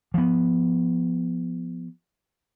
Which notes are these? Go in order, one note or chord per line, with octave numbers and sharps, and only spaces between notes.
F3 B3